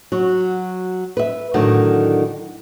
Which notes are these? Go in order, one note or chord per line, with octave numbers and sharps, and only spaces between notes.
F#3 F#4
B4 E5
A2 D3 D#3 F#3